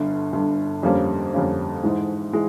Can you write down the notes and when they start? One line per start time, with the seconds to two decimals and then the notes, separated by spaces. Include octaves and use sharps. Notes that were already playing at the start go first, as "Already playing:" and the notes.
Already playing: G1 G2 D3
0.32 G1 G2 D3
0.83 F2 D3 G3 A#3 C#4
1.33 F2 D3 G3 A#3 C#4
1.83 G#2 E3 G#3
2.33 E3 G#3